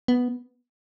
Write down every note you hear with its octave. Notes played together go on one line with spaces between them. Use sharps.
B3